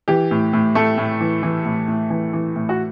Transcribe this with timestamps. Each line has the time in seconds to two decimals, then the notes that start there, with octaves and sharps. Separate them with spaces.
0.08 E3 G4
0.31 A2
0.53 A2
0.75 A2 A3 A4
0.98 A2
1.20 E3
1.43 E3
1.65 A2
1.88 A2
2.10 E3
2.33 E3
2.56 A2
2.69 F#4